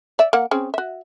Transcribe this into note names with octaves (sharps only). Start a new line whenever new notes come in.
D5 E5
A#3 F#5
C4 C#4 G#4
F#4 E5